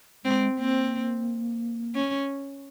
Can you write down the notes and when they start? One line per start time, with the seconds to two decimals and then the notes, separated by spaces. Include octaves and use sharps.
0.25 G#3 C4
0.58 A#3 C4
1.95 C#4